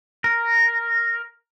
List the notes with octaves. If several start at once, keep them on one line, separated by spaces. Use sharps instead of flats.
A#4